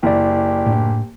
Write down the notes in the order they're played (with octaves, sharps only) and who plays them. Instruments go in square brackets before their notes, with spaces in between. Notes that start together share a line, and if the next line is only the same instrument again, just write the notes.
[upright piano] F#1 [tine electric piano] E4 D5 [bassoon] G4
[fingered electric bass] A2 D4